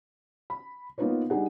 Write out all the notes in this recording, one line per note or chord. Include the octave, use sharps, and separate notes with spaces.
B5
A#3 B3 D#4 F4 B4 C#5
G3 D4 D#4 G#4 F#5